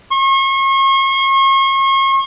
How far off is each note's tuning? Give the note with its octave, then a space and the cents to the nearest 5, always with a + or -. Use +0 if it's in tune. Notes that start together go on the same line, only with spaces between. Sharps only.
C#6 -40